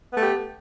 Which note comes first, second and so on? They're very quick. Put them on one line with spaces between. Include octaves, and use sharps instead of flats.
B3 A3 G4